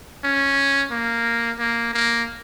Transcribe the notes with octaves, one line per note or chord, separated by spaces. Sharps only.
C#4
A#3
A#3
A#3